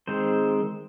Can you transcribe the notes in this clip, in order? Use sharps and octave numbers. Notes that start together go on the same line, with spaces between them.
D#3 G#3 C4 C5